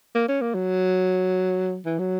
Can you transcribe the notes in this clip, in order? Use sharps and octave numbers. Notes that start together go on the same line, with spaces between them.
A#3
C#4
A#3
F#3
E3
F#3